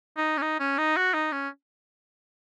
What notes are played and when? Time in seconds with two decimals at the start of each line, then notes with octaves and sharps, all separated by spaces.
0.17 D#4
0.38 C#4
0.42 D#4
0.60 C#4
0.78 D#4
0.97 F#4
1.14 D#4
1.32 C#4